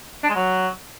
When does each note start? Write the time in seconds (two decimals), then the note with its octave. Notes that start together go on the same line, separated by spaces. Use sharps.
0.24 D4
0.30 G#3
0.35 F#3